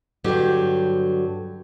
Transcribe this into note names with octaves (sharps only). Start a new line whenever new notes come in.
G2 D3 F#3 G4